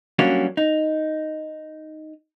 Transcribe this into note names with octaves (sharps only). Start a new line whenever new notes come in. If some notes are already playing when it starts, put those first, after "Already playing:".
F#3 G3 A#3 C#4 D4 F#4
D#4